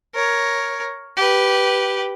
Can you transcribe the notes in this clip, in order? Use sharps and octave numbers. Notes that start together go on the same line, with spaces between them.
A#4 C#5
G4 B4